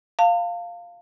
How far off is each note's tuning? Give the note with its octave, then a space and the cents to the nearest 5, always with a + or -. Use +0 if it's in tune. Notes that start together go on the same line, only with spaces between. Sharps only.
F5 +0 A5 +40